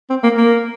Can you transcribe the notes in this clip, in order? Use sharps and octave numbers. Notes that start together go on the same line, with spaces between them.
C4
A#3
A#3